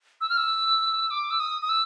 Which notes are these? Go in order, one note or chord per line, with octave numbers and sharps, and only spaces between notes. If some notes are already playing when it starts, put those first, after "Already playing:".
E6
F6
E6
D6
E6
D#6
D#6
E6